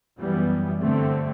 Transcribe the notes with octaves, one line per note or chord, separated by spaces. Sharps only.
F#2 E3 G3 B3
G2 D3 A3 C4